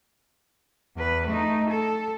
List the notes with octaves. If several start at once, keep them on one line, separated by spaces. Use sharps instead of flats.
E2 B4
A3 D#4
A4